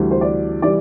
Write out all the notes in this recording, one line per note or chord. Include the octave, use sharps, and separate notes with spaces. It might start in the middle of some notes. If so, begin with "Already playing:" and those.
Already playing: D2 C3 E3 G3
C5
D5
C3 E3 G3 D5